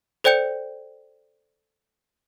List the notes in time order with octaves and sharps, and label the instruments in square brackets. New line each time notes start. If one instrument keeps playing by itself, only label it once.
[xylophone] A4 C5 D5 G5 G6 C#7